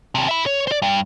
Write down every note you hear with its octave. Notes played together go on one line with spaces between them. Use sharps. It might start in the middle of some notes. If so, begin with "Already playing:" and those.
D#2 C3
E5 B5
C#5
C5 D5
G2